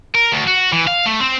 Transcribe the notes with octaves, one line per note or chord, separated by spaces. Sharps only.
A#4
D2
F#4
E3
F5
A3
C4